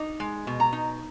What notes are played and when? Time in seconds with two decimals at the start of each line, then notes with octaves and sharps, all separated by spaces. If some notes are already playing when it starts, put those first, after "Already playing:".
Already playing: D#4
0.20 G#3
0.47 B2
0.60 A#5
0.73 D#4